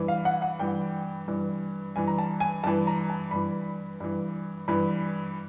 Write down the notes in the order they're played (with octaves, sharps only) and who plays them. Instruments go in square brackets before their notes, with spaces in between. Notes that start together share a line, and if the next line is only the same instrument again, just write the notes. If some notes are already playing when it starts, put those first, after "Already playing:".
Already playing: [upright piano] G2 E3
F5
F#5
F#5
G2 E3 G5
G2 E3
G2 E3 G#5
A#5
A5
G#5
G2 E3 A5
A#5
A5
G2 E3 B5
G2 E3
G2 E3 B5